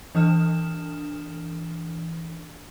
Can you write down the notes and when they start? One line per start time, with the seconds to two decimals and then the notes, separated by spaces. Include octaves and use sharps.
0.15 E3 D4 D#6 F6 E7